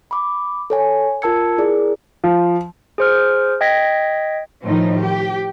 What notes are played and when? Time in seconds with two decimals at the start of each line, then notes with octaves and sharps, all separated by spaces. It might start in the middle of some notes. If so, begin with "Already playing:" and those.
0.11 B5 D6
0.70 A4 C#5 G#5
1.22 F4 A#4 A5 E6 G#6 C#7
1.58 E4 G#4 A#4 D5
2.24 F3
2.98 G#4 C5 F6
3.61 D#5 G5 G#6 A#6 B6
4.64 A2 D#3 F3 D#4
4.99 G4